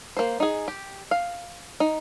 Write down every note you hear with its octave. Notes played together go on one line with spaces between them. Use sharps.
A#3 C5
D#4 G#4
G4
F5
D#4